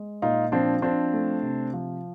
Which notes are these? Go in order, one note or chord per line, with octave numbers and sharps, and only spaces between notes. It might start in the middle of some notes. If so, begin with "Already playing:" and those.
Already playing: G#3
A#2 D#4 F4
F3 C4 D4
F3 C4 D4
A3
C3
F3